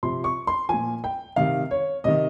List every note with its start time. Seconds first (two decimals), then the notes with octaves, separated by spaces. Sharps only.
0.03 C3 F3 C6
0.24 C#6
0.47 C6
0.69 A#2 F3 G#5
1.04 G5
1.36 C3 D#3 F5
1.71 C#5
2.04 C3 D#3 D#5